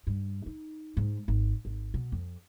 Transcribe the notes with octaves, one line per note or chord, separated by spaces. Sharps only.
G2
D#4
G#2
G#1
G#1
B2
F2